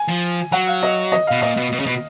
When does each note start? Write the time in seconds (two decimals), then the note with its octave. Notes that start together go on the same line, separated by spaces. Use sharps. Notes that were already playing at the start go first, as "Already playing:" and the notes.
Already playing: G#5
0.08 F3
0.52 F#3 F#5
0.67 F5
0.83 D#5
1.12 D#5
1.27 B2 F5
1.42 A#2 D#5
1.57 B2
1.72 B2
1.80 C#3
1.86 B2